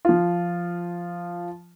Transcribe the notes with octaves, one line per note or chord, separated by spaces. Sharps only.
F3 F4